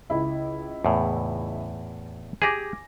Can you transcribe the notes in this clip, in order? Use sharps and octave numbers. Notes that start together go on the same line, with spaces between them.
C#2 E4
E2 A2
G4 G#4 G#5 D6 A#6